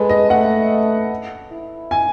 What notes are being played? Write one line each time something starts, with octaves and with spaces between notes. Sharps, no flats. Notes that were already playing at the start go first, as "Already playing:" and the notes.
Already playing: G#3 A4 B4
D#5
A3 F#5
E4
G#5